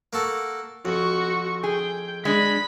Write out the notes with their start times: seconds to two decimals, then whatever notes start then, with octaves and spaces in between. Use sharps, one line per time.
0.13 A#3 F#4 A4
0.85 F2 F#4 C#6
1.63 G#4 G5
2.25 G#3 D4 B5 B6